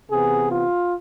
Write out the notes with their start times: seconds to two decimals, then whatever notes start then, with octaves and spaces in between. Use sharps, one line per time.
0.11 C3 E3 B3 G#4
0.51 F4